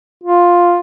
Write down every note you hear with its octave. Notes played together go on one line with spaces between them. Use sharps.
F4